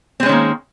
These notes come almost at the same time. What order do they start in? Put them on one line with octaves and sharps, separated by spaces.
C4 G#3 C#4 D#3 A#3